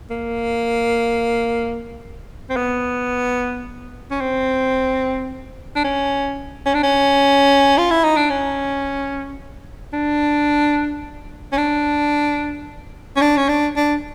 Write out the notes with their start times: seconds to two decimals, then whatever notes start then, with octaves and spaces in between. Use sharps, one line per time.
0.10 A#3
2.50 C4
2.56 B3
4.11 C#4
4.21 C4
5.76 D4
5.84 C#4
6.66 C#4
6.75 D4
6.83 C#4
7.78 F4
7.91 E4
8.04 D#4
8.17 D4
8.30 C#4
9.93 D4
11.52 C#4
11.58 D4
13.17 C#4
13.21 D4
13.37 C#4
13.49 D4
13.76 D4